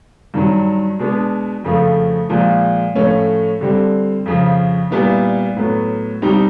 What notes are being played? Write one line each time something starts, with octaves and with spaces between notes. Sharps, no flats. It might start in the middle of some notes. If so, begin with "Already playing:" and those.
G2 D#3 F#3
B2 G#3 B3 D4
F2 C#3 F3 A3
A#2 F3 G#3
A2 F3 A3 C#4
D3 G3 C4
F2 C#3 F3
A#2 G3 B3 E4
A2 F#3 B3
B2 G3 C4 D#4